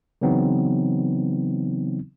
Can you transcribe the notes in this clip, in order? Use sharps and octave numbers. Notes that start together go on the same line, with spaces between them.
C#3 E3 F#3 B3 C4 D#4